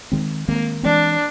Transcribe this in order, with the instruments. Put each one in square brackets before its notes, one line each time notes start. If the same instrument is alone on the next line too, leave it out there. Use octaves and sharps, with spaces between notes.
[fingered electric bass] D#3 G#3 C4
[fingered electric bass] D#3 G#3 C4 [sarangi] A#3
[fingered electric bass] E3 G#3 C4 [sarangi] D4